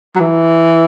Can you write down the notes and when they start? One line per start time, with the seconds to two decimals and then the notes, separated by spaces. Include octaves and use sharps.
0.16 F#3
0.20 E3